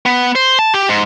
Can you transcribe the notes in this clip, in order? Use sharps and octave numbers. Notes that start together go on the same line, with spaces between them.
B3
C5
A5
G4
G#2